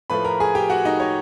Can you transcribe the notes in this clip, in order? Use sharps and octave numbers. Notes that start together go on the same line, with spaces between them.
A2 F3 A3 B4 B5
A#4 A#5
G#4 G#5
G4 G5
F#4 F#5
D#4 D#5
C#5